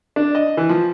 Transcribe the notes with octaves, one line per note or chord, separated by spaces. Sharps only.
D4
D#5
E3
F3